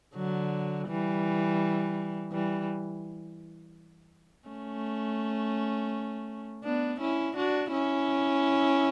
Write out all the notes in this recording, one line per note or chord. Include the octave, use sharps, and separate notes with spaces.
D3 F#3
E3 G3
E3 G3
A3 C#4
B3 D4
C#4 E4
D4 F#4
C#4 E4